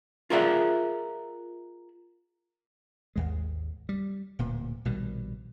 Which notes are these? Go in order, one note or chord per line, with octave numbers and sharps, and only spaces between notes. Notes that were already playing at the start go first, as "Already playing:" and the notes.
F4 G#4 A#4 D5 E5 F#5
G#1 D#2 G#3
G3
D1 A#2
A#1 B2 D#3 G3